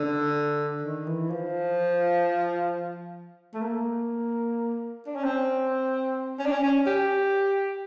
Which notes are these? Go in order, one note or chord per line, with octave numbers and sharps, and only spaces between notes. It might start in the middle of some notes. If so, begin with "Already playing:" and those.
Already playing: D3
D#3
E3
F3
A3
A#3
D4
C#4
C4
C#4
D4
C#4
C#4
G4